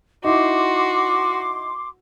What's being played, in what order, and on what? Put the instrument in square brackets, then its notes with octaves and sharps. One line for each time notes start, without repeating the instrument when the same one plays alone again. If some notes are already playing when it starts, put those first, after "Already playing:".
[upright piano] D#4 E4 [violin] F#4 [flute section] C6 D6